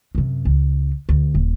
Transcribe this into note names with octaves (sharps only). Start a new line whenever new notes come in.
F#2 C3
C#2
D2
D#1